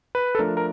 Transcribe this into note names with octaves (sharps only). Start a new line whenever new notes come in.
B4
A4
F3 A3 D4 A#4
A#4